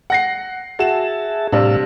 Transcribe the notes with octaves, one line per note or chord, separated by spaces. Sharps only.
F#5 A#6 C7
F#4 G#4 E5 A5 E7
A2 C3 G3 D4 F5 E6